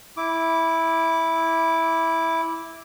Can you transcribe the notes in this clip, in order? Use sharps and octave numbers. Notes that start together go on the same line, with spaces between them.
E4 D6